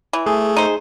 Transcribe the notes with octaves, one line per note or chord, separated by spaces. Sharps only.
E3
A3 G#4
D#4 C5